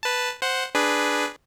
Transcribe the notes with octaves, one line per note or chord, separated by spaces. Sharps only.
B4 A5
C5 F#5
D4 G#4 B4